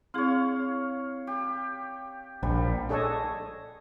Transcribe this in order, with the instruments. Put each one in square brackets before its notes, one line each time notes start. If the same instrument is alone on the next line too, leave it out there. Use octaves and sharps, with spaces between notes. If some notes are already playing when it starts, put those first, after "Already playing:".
[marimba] C4 E4 G#4 [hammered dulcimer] C#5 F5
[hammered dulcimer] G4
[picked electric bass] A#1 [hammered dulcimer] G3
[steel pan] D4 G#4 A4 C#5 D#5